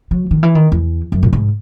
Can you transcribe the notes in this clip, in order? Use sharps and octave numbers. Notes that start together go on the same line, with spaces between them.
F#3
D#3
E3
D#3
E2
F#2
A#2
G#2